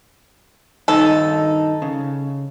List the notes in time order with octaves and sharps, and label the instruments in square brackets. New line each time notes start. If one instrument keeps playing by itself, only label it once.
[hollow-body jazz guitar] G2 D#3 D#4 [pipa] A4
[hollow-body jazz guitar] C#3